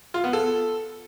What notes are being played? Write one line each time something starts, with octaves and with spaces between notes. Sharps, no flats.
F4
B3
A4